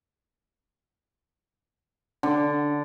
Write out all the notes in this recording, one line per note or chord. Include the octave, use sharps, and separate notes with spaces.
D3